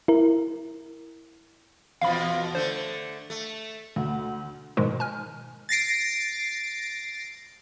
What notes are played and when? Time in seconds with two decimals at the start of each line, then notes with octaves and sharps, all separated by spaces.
0.08 E4 A#4
2.01 E2 B2 F3 F5 B5
2.55 D3 A3 C5
3.30 A3
3.96 D2
4.77 G#2 B2 D#3 F3 G#3
5.00 G#5 F6
5.69 A6 A#6 C7 D7